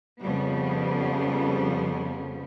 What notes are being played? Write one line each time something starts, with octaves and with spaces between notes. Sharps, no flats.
F2 C#3 F3 G3 B3